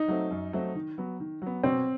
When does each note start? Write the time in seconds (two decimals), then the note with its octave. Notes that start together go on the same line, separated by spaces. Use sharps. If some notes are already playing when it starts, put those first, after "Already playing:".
Already playing: D#4
0.08 F#3 A3 C4
0.31 F#2
0.53 F#3 A3 C4
0.75 D#3
0.98 F#3 B3
1.20 D#3
1.42 F#3 B3
1.63 B2 C4